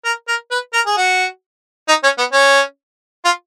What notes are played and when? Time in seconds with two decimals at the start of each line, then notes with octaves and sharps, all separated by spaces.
0.05 A#4
0.28 A#4
0.51 B4
0.73 A#4
0.87 G#4
0.97 F#4
1.88 D#4
2.04 C#4
2.18 B3
2.33 C#4
3.25 F4